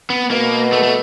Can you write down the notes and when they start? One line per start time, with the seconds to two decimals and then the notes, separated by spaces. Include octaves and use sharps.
0.10 B3
0.31 B2 A#3
0.72 A3
0.83 A3